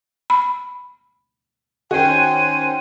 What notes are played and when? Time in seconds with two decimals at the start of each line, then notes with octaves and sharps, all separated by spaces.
0.30 B5
1.91 D#3 C#4 F#4 C5 G5 G#5